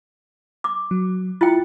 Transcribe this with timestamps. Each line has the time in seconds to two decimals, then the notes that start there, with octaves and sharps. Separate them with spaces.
0.64 D6
0.91 F#3
1.41 E4 F4 G5 A#5 F#6 A6